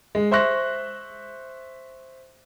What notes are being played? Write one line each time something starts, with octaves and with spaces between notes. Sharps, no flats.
G#3
C5 E5 C6 C#6 F#6 A#6